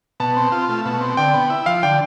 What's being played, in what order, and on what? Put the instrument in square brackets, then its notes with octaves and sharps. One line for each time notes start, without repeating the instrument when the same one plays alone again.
[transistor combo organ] B2 [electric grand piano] A5
[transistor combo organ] C4
F4
A3
B2
C4
[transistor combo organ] D3 [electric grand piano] G5
[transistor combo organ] B3
E4
[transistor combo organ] F3 [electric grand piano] F5
[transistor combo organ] D3 [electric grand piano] G5